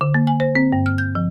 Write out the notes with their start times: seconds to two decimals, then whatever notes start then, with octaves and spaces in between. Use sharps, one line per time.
0.01 D3
0.14 A#3
0.27 G#5
0.40 C5
0.55 C4
0.73 G2
0.86 F6
0.98 G6
1.15 F3